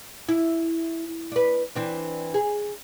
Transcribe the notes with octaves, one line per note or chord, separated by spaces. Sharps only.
E4
D4 B4
E3 C4 D4
G#4